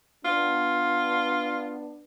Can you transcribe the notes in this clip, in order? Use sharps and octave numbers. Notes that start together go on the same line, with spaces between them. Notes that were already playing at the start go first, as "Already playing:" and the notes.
B3 D4 F4